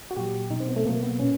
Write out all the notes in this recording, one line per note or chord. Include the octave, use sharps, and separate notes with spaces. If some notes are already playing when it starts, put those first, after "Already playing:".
F#4
A#2 F#3 G4
B2 F#3 D#4
C4
B3
A3
B2 F#3 A#3
B3
A#2 C#4